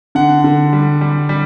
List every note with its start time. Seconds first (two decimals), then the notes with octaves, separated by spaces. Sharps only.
0.15 D3 F#5
0.44 D3
0.73 G3
1.01 G3
1.29 G3